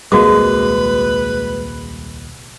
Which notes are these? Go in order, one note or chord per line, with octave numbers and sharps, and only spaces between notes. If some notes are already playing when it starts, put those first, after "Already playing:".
D#1 C2 G#3 A#3 F#4 B4 D6